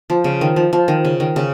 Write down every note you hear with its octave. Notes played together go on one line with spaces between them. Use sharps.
F3
C#3
D#3
F3
F3
D#3
C#3
D#3
C#3